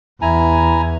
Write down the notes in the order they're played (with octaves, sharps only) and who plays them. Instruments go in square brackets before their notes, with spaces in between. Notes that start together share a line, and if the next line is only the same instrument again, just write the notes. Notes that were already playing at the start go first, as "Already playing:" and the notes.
[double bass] E2 [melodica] E4 G#5 A#5